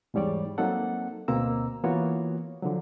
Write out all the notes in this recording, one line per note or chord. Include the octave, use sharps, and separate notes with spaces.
E2 G#2 G3 C#5 D5
F#3 A#3 C4 D#4 A4 F#5
D2 B2 A#3 C4 A#5 E6
E3 A#3 B3 F4 F#4 C#5
D3 F3 F#3